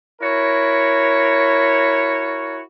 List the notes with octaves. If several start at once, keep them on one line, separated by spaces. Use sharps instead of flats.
E4 F#4 A#4 C#5